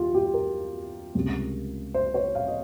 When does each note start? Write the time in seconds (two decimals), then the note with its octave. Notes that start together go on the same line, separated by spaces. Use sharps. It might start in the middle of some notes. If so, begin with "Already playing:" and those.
Already playing: D#2 D#3 G3 F4 G4
0.15 G4
0.34 A#4
1.15 C#2 C3 G3
1.94 C5
2.14 C#5
2.35 F5
2.48 D#5